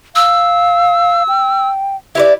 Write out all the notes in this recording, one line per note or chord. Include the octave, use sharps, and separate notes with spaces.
F5 E6
G5
E4 G4 B4 D5